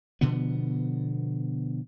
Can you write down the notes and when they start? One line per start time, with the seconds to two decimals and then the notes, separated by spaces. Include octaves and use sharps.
0.21 B2 D3 F3 B3